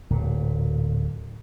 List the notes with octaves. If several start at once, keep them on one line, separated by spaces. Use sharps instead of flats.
D1 A#2